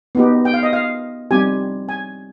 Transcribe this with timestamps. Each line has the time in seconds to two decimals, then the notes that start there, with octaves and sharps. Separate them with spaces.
0.15 B3 D#4 G4
0.45 G5
0.54 F5
0.63 D#5
0.73 F5
1.31 G3 C4 D#4 G4 G#5
1.89 G#5